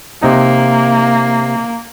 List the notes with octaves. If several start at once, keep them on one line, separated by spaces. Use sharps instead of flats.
C3 A#3 D#4